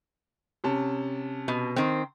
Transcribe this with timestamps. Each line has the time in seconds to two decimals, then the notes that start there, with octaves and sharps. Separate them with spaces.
0.64 C3 C#4 A5
1.48 B2
1.76 D#3 C4